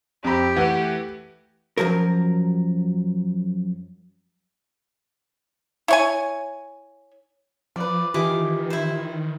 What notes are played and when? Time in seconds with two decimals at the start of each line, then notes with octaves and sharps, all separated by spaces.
0.24 F2 C4 G4 A#5 B5
0.56 E3 A3 B4 F#5
1.77 F#2 C3 F3 F#3 A#4
5.88 E4 C#5 G#5
7.76 F3 B4 D5
8.14 D#3 E3 F4 G4 G#4 D#5 D6
8.70 E4 C5